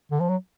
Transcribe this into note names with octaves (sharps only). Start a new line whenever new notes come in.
D3
F3
F#3